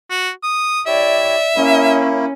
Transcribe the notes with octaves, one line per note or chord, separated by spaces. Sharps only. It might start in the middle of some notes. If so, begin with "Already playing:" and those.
F#4
D#6
E4 G4 C#5 D5 E5
A#3 C#4 E4